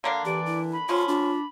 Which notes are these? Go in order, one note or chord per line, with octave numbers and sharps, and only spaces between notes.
D3 A#3 D4 F5
E3 G4 D5
E4
B5
D3 F3 C#4 F4
D4 F4